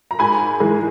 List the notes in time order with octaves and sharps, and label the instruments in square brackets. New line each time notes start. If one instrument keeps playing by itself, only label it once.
[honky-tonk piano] A#5
G#2 G#5 B5
E3 G#3